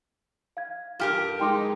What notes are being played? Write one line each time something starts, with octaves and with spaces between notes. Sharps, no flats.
F5 G#6
G2 F4 G4 A#4 F5 F6
G#3 D#4 G5 C6 D6